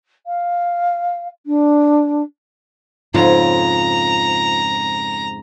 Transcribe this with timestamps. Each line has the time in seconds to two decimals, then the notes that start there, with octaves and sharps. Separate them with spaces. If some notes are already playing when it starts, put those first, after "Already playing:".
0.26 F5
1.46 D4
3.14 F2 G#2 C#3 F4 A#5